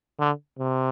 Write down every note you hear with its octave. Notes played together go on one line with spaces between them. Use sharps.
D3
C3